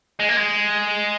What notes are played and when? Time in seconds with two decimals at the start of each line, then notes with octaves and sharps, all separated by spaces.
0.20 G#3
0.29 A#3
0.37 G#3